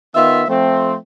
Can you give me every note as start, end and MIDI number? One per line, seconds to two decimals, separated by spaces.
0.15 0.43 51
0.15 0.43 59
0.15 0.43 65
0.15 0.43 76
0.48 0.96 53
0.48 0.96 57
0.48 0.96 60